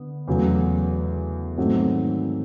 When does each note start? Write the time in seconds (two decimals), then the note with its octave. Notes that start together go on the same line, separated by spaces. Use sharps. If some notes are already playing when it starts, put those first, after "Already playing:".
Already playing: D3 B3
0.28 E2 C#3 F#3 A3
1.58 G#2 D#3 F#3 A3 C4